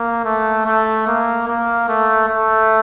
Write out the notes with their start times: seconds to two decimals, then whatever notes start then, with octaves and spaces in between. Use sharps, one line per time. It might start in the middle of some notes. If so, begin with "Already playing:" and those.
Already playing: A#3
0.24 A3
0.66 A3
1.07 A#3
1.47 A#3
1.88 A3
2.29 A3